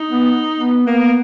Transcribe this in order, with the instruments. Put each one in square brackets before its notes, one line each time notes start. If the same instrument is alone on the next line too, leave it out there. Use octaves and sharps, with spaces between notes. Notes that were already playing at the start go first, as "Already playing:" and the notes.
Already playing: [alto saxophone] D#4
[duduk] B3
B3
[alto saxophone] A#3 [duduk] B3